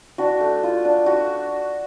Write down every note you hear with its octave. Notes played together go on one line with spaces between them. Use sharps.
D4 F#4
A3
F4
D4
F#4